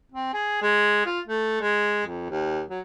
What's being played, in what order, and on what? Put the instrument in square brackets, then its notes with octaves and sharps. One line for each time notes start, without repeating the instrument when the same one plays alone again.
[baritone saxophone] C4
G#4
G#3
F4
A3
G#3
F2
D#2
F#3